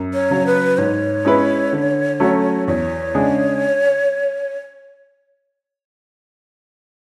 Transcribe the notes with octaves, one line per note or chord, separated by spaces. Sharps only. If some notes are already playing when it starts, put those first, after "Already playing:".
Already playing: F#2
C#5
C#3 F#3
B4
G#2 C#5
G#3 C#4 E4 B4
D3
F#3 A3 C#4 F#4
E2 C#5
C#3 G#3 D4 G#4